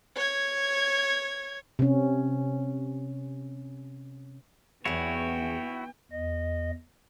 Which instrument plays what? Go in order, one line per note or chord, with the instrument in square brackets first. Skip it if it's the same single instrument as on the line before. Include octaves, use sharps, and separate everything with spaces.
[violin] C#5 G#6
[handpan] C3 C#4
[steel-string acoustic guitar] E2 G#4 [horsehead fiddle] B3 G5 [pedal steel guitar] E4 F#4 C#5
[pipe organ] E2 D#5